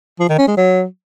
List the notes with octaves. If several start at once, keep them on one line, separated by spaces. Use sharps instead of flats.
F3
D#3
C#4
G#3
F#3